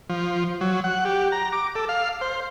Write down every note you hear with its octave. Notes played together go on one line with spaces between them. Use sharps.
F3
F#3
F#5
G4
A#5
D6
A4
F5
C5